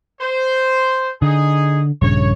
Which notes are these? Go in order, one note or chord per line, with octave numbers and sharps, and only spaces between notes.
C5
D3 D#4 G#4
A#1 G2 C#3 C#5